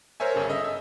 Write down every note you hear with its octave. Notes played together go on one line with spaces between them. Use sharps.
A#4 C5 C#5 E5 G#5
G1 C#3 A4
D#5 E5
E5